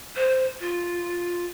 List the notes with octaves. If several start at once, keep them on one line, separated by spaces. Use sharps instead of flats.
C5
F4